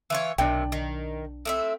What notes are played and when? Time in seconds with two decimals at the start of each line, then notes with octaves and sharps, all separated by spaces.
0.10 E3 F4 C#5
0.38 B1 C3 D#3 D4 D5 G5
0.72 D#3
1.45 A2 C4 E5